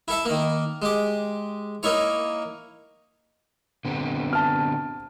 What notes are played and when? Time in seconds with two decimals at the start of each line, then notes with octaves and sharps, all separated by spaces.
0.08 E4 A4 E5
0.25 D#3 A#3
0.82 G#3 G4
1.83 A#3 D#4 E4 C#5
3.85 D3 B3 C4
4.33 A5 F6